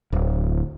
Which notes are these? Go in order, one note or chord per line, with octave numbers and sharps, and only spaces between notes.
D1